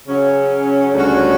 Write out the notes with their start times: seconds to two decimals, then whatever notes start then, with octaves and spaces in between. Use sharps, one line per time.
0.06 C#3 F#3 C#4
0.93 D2 C#3 G3 C#4 F#4